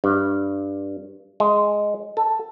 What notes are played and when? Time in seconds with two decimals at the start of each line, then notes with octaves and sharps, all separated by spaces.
0.04 G2
1.40 G#3
2.17 A4